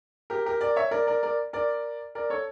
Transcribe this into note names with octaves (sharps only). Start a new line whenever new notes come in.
G4 A#4
G4 A#4
A#4 D5
C#5 E5
A#4 D5
A#4 D5
A#4 D5
A#4 D5
A#4 D5
A4 C#5